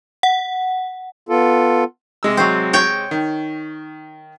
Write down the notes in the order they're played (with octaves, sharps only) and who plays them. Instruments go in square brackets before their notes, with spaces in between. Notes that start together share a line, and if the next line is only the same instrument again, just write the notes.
[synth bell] F#5
[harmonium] B3 F4 A4
[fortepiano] C3 G#3 E6
[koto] F#3 C4
C#5 G5
[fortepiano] D#3